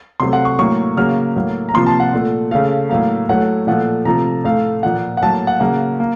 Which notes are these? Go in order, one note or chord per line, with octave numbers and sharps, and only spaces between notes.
C3 F#3 A3 C6
F#5
C#6
A2 F#3 A#3 C#6
C#3 F#3 A#3 F6
A2 F#3 A#3
A#5
C3 F3 A#3 C6
A5
F#5
A#2 A3
C#3 A3 F5
A2 F#3 A#3 F5
A2 F#3 A3 F#5
A#2 F3 A3 F#5
C3 F3 A3 A#5
A2 A3 F5
A#2 F3 A#3 F#5
F#5
A2 F#3 A#3 A5
F#5
C#3 F#3 A#3 F#5
A#3